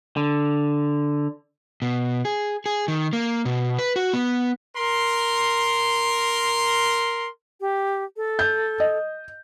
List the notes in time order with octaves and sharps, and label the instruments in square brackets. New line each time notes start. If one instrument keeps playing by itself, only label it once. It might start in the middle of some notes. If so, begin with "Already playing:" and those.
[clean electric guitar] D3
[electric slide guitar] B2
G#4
G#4
D#3
A#3
B2
B4
F#4
B3
[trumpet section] A#4 C6
[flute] G4
A4
[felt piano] G6
D#5